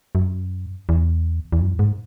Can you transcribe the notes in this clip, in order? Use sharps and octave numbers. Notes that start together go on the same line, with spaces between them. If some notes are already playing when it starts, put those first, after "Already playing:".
F#2
E2
E2
F#2
G#2